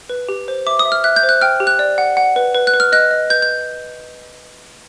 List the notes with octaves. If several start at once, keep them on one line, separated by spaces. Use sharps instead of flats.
B4
G4
C5
E5 D6
D#6
E5
F6
E5 F#6
G6
C5
F#6
G5 F6
G4
F#6
D5
F#5
F#5
B4
B4
F#6
B4
F6
D#5 F#6
D#5
B4 G6
G6